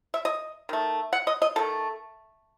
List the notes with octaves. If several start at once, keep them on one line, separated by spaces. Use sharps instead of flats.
E5
D#5
D#3 A3
F#5
D#5
D#5
D#3 A3 A4